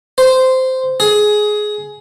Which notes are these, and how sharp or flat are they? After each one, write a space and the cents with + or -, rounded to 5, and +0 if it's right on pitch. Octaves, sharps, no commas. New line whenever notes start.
C5 -10
G#4 +15